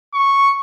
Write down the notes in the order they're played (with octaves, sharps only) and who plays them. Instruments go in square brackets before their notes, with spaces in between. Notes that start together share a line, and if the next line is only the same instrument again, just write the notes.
[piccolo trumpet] C#6